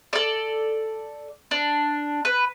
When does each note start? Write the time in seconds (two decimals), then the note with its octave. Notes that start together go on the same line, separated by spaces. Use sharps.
0.13 A4 D5
1.51 D4
2.25 B4